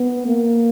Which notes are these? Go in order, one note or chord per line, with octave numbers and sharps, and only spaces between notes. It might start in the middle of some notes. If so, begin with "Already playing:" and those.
Already playing: B3
A#3